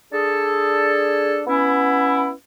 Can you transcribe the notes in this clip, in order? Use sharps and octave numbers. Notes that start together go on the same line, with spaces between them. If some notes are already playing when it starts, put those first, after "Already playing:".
D4 G#4 A4
B3 C#4 E4